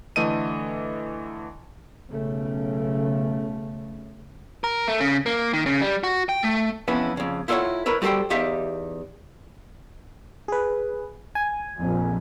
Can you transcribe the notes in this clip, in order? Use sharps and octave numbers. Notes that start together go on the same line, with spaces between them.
D3 E3 A3 D#5 D#7
B1 C#3 A3
A#4
A3
C#3
A#3
D#3
C#3
G3
F#4
G5
A3
F2 E3 B3 C#4 E4
F2 C#3
E4 F4 A4 A#4 C#5 F#5
E4 A#4 B4 C#5
G3 F#4 G4 A4 C5 G5
E2 D#4 G4 E5 F5
G#4 B4
G#5
A#1 F2